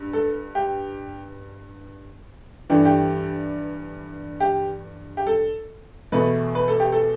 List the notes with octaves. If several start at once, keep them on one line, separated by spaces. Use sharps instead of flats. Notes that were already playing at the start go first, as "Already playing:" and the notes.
Already playing: G2
A4
G4
G2 E3 A3 D4 G4
G4
G4
G4
A4
E2 B2 A3 B4
B4
A4
G4
A4